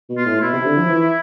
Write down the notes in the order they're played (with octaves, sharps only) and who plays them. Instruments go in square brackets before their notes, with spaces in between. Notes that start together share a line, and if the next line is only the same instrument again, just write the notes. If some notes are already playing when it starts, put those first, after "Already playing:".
[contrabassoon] B2
[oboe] F4
[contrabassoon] A2
[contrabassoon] B2 [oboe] E4
[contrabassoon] C3
D3
F3
E3